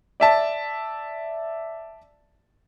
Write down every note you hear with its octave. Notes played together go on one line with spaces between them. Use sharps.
D5 E5 A5